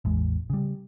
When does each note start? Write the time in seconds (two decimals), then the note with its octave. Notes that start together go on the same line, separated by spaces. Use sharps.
0.05 A1 E2 G#3
0.50 C#3 G3